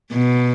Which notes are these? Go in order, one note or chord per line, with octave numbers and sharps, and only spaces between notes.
B2